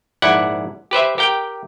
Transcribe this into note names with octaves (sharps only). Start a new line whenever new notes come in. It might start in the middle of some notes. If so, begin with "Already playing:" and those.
A#1 G#2 E4 D5 F#5
G4 B4 C5 E5
G4 A#4 G5